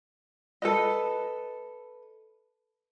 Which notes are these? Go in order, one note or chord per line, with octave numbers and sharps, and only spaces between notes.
A4 B4 D#5